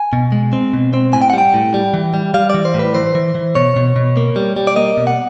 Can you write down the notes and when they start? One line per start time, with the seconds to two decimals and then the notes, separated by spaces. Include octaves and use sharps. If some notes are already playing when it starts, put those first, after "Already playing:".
Already playing: G#5
0.13 B2
0.32 G#3
0.53 C4
0.73 B2
0.94 C4
1.13 A2 G#5
1.22 G5
1.30 F#5
1.33 G3 G5
1.54 A2
1.74 G3
1.94 E3
2.14 G3
2.34 G3 F5
2.50 E3 D5
2.65 C5
2.74 A2
2.79 B4
2.94 E3 C5
3.15 E3
3.35 E3
3.55 B2 C#5
3.76 B2
3.96 B2
4.17 A#3
4.36 G3
4.57 G3
4.67 D5
4.76 A#3 D#5
4.97 B2
5.07 F#5